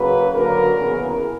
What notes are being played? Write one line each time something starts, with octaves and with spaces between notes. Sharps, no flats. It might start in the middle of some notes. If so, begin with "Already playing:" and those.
Already playing: C#3 F#3 A#3 B4
D3 F#3 A#3 A#4
C#3 E3 B3